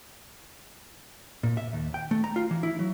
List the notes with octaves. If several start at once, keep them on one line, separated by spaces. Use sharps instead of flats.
A#2
E5
D#2
G5
A3
A#5
F4
E3
E4
F#3